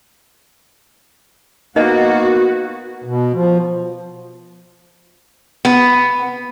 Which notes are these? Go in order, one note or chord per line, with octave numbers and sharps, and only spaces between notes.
A#3 B3 D#4 F#4 D#5
B2
F3
B3